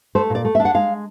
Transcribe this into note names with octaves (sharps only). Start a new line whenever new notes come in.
A3 C5
A#2 D5
A3
E5
D4
F#5
G#3 F5